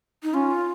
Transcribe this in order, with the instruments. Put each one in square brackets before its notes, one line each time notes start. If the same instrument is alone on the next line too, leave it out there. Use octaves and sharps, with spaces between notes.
[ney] D#4
[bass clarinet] C#4 [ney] F4